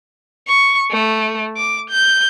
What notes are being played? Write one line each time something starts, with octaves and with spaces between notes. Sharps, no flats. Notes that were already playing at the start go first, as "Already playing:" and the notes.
C#6
A3
D6
G6